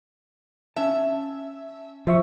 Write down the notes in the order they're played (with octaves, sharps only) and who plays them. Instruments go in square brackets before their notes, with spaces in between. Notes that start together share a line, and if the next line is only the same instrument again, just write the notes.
[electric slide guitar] C#4 A5 [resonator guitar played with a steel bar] E5
[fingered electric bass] F3 [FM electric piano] C5 E5 C#6